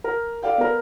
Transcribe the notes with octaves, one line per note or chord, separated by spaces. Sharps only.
A#4
A4 D5 F5 G5
B3 A#4